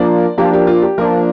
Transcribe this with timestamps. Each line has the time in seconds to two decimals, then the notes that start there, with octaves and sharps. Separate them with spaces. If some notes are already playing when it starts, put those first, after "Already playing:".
Already playing: F3 A#3 D4 D5
0.38 F3 A#3 D4 G4
0.53 G4
0.67 F4
0.82 G4
0.98 F3 A#3 D4 A#4